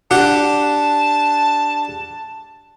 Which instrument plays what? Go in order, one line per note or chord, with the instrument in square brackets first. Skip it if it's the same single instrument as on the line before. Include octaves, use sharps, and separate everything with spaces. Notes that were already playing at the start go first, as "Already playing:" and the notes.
[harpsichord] D4 G4 F#5 [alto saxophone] A5